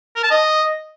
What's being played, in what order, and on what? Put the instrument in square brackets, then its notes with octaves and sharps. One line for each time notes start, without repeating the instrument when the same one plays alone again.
[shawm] A#4
A5
D#5